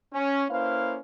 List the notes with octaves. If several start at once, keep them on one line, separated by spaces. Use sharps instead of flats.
C#4
A#3 C#4 E4 B4 C5 F5